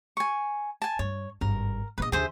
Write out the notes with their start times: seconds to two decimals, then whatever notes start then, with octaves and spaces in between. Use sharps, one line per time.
0.17 G#5 C#6
0.82 G#5 A5
0.99 G2 C#5
1.41 G#1 G2 A#4
1.98 A#1 B3 B4 D#5
2.12 D#2 D3 G#4 C5 E5